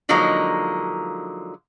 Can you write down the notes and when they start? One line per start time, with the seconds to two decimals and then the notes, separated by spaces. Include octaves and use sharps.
0.09 D3 F3 F#3 G#3 A#3 D#4